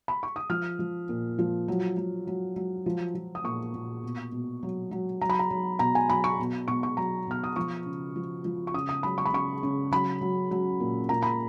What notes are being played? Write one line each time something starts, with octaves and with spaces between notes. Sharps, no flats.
B5
C#6
D#6
F3 F6
F3
A#2
F3
F#3
F#3
F#3
F#3
F3
F3
D#6
A#2 C#6
A#2
B2
B2
F#3
F#3
F#3 A#5
B5
A#5
F#3
B2 A#5
G#5
F#3 B5
C#6
B2
B2 C#6
C#6
F#3 A#5
B2 F6
D#6
F3 C#6
C#3
F3
F3
C#6
C#3 D#6
D#6
F#3 B5
C#6
B5
C#3 C#6
C#3
F#3 B5
F#3
F#3
A#2
A#2 A#5
B5